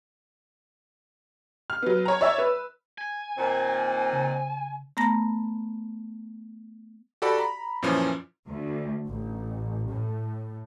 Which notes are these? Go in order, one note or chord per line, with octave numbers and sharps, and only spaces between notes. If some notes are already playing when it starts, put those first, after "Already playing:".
F6
F#3 B3
C#5 A#5
C#5 D5 E5 E6
B4
G#5
A#2 D#3 C4
C#3 G5
A3 B3 A#5 A#6
F#4 G4 A4 D5 F#5 B5
A#5 B5
F#2 A#2 E3 F3 C#4
D2
A1
A2